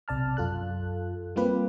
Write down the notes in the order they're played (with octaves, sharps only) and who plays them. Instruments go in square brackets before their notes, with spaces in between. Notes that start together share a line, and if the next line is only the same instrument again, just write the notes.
[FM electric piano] B1 C3 D5 A5 F6
F#2 F4 A4 F#6
G3 A#3 C4 F4 G4 B4